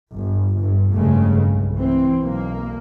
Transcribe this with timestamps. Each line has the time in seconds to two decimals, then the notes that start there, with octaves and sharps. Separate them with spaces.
0.14 G1
0.54 G1 G2
0.93 F1 G2 C#3 G#3 A3
1.47 B1
1.76 E3 C4
2.20 B1 A#3